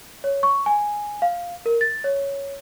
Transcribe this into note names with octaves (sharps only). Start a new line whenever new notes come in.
C#5
C#6
G#5
F5
A#4
A6
C#5